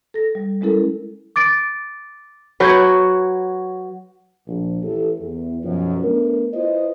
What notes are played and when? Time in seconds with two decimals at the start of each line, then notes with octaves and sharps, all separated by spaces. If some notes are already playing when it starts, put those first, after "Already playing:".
0.14 A4 A#6
0.35 G3
0.61 G3 G#3 C#4 E4 A4 A#4
1.36 D6 A6 D7
2.60 F#3 F#4 B4 C#5 G6 G#6
4.47 A#1
4.83 A1 E3 G4 A4
5.20 E2
5.63 B1 F#2 F3
6.04 A3 B3 D4 A#4
6.53 E4 F4 B4 C5 D#5